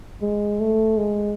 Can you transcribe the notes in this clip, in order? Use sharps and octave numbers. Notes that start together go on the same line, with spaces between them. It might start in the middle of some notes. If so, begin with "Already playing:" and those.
G#3
A3
G#3